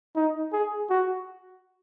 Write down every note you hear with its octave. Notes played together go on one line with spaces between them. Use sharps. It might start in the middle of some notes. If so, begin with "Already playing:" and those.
D#4
G#4
F#4